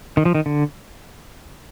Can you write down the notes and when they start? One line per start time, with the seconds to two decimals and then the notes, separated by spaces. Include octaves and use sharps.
0.17 D#3
0.25 F3
0.35 D#3
0.46 D3